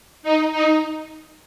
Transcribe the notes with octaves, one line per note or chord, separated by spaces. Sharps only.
D#4
D#4